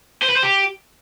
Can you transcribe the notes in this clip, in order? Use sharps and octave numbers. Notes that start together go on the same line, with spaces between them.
C5
B4
C5
G4